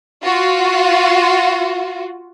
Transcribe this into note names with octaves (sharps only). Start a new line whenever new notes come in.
F4 F#4